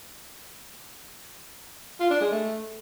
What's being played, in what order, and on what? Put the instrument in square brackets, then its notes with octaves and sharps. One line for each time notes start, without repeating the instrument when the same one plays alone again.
[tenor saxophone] F4
D4
G#3
A3